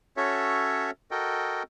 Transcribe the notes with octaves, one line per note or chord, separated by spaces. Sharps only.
C#4 F#4 A4 C#5 E5
F#4 A4 A#4 D#5 G5